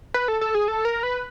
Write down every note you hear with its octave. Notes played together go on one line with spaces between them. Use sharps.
B4
A4
A4
G#4
A4
A#4
B4